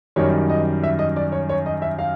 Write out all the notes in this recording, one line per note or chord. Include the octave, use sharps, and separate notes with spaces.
F#2 D#3 G3 C#5
D#5
E5
D#5
D5
C#5
C#5
D#5
E5
F5